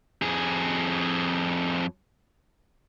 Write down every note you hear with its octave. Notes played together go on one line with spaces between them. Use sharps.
F2 G#4